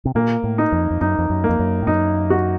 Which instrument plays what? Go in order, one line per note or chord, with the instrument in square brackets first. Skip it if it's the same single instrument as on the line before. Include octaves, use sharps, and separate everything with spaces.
[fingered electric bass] C3
[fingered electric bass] A#2 [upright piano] A#3
[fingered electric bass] A2
[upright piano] D#4
[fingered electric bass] F2
F2
[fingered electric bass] F#2 [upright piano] D#4
[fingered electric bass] F2
F#2
[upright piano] A#3
[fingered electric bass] F2
F#2
A2
[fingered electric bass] F#2 [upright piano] D#4
[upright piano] F#4